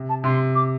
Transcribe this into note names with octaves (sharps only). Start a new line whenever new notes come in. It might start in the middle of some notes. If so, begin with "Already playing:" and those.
Already playing: C3
A5
C3 C6
D6